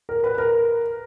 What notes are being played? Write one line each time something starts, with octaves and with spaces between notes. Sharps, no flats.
A#4
B4
A#4